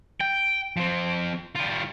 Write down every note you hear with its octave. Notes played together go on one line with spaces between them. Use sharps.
G5
F3 C4
G3 F4